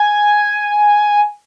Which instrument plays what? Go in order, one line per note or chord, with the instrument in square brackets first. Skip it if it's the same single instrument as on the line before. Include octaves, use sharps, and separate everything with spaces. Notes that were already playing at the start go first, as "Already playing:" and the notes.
Already playing: [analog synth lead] G#5